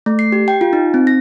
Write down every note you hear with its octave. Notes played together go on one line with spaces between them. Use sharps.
A3
C7
G4
G5
F4
D#4
C4
A#6